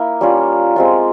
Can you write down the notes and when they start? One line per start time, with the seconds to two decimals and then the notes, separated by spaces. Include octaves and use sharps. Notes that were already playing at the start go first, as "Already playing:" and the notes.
Already playing: A#3 E4
0.21 G3 C#4 F4
0.76 G#3 C4 F4